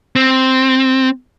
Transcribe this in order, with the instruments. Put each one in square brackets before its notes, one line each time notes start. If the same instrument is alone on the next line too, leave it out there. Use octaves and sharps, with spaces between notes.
[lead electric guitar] C4